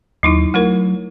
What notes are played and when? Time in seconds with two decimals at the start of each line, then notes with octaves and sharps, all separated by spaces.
0.23 D#2 F#3 D#4 E4
0.54 F#3 A3 E4 A#4